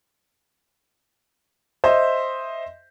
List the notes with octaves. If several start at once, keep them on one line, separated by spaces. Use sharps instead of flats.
C5 D#5 E5